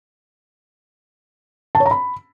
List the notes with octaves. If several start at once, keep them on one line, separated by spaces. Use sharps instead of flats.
A5
C#5
A#5
B5